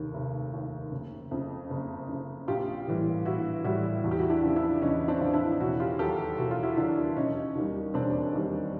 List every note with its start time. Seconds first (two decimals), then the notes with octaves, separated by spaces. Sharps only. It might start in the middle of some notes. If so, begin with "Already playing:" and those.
Already playing: F1 D#2 D#3
0.14 F1
0.53 D#2 D#3
0.92 F#1
1.31 F2 C#3
1.70 F#1
2.09 F2 C#3
2.48 A#1 F4 G4
2.87 A2 E3 G3
3.25 A#1 E4 F#4
3.64 A2 E3 G3 E4 F#4
4.04 E2 F#4
4.11 G4
4.19 E4 F#4
4.30 D4 E4
4.43 C#3 F3
4.56 D4 E4
4.82 E2 C#4 D#4
5.08 C4 D4
5.21 C#3 F3
5.34 D4 E4
5.60 E1 E4 F#4
5.80 F4 G4
5.99 D#2 D#3 F#3 G4 A4
6.38 E1 F#4
6.51 F4
6.63 E4 F#4
6.77 D#2 D#3 F#3 D4 E4
7.16 E1 C#4 D#4
7.55 D#2 D#3 G3
7.94 E1 C4 D4
8.33 D#2 D#3 G3